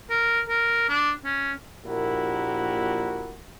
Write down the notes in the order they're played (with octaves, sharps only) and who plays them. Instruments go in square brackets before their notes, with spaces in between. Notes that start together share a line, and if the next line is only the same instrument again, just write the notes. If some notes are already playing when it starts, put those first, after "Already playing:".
[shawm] A#4
A#4
D4
C#4
[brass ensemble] A#1 A#2 E4 F#4 G4 A#4